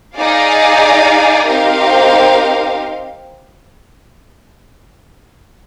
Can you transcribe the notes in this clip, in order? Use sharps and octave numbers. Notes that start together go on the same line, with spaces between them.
D#4 G#4 D5 F5
C4 D#4 G4 A#4 F5